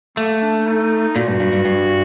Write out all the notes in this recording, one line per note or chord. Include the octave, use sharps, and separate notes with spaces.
A3 A#3
D4
D#4
A#2 F#4
G2
G2
G2
G2